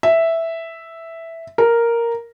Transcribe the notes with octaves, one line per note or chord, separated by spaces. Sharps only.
E5
A#4